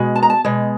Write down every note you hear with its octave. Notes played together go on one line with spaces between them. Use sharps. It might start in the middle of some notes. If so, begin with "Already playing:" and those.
Already playing: B2 G#3
A5
A#5
A5
B2 G#3